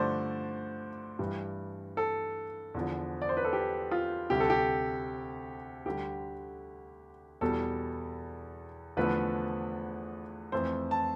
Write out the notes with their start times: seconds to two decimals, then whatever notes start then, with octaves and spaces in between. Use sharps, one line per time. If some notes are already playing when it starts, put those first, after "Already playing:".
Already playing: G2 D3 F3 A3 C5 D5
1.19 G2 E3 G3
1.97 A4
2.74 E2 D3 F3
3.22 D5
3.29 C5
3.37 B4
3.44 A4
3.53 G4
3.91 F4
4.30 D2 C3 G3 G4
4.40 A4
4.50 G4
5.86 D2 D3 G3 G4
7.41 E2 B2 G3 A4
8.97 E2 D3 F3 A3 B4
10.52 F2 E3 A3 C5
10.91 A5